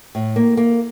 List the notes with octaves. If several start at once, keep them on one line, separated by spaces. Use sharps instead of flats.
A2
A#3
A#3